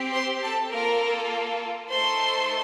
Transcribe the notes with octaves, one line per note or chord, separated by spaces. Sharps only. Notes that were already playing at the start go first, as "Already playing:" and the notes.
Already playing: C4 G4
C5 C6
A4 A5
A#3 F4 A4 A#4 A#5
A3 D#4 A4 C5 C6